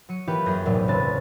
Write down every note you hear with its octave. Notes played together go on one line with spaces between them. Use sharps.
F#3 C#7 D#7
E3 A#3 E4 F4 G4 B4
F#2 G#4 G6 A#6
B1 E2 A2 C3 F#3
C#2 C#3 C4 B4 A6